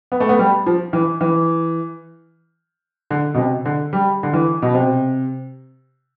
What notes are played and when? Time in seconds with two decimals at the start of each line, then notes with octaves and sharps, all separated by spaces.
0.12 B3
0.20 A3
0.29 B3
0.39 G3
0.66 F3
0.93 E3
1.21 E3
3.11 D3
3.34 B2
3.38 C3
3.65 D3
3.93 G3
4.23 D3
4.33 E3
4.62 B2
4.74 C3